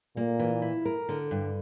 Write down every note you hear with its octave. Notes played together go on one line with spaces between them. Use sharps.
A#2 A#3
E3
E4
A#4
D3
G2